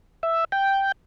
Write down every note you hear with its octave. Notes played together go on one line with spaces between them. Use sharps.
E5
G5